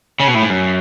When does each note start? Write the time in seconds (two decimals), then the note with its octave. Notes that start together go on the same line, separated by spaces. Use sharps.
0.20 C#3
0.27 B2
0.34 A2
0.43 G#2
0.50 F#2